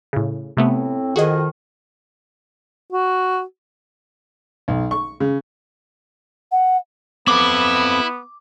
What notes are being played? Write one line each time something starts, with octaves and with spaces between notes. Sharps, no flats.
A2 C#3
A2 C3 A3 B3 C4
F2 D#3 F#4 G#4 D#5
F#4
B1
C#6
C#3
F#5
B3 C4 E4 A4 D6